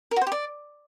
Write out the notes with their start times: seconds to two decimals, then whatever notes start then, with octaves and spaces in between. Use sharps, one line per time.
0.11 A#4
0.16 F#4
0.21 C5
0.27 G4
0.32 D5